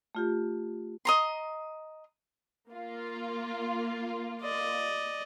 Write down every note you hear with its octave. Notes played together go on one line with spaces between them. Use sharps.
A3 F4 G4
D#5 A#5 C6
A#3 F4
D5 D#5